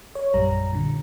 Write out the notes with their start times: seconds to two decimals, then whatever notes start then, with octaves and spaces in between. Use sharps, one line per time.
0.15 C#5
0.33 A#1 F#2 G3 A#5
0.72 A#2 D3